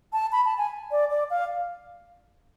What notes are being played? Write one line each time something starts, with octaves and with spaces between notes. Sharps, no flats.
A5
B5
A5
G#5
D5
D5
F5